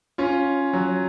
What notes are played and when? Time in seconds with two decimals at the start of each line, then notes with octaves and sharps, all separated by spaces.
0.18 C#4 F4
0.73 F#3